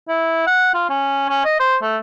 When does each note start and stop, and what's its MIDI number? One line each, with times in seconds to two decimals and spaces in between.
0.08 0.44 64
0.47 0.74 78
0.74 0.88 65
0.90 1.24 61
1.29 1.41 61
1.45 1.58 75
1.60 1.77 72
1.82 1.97 57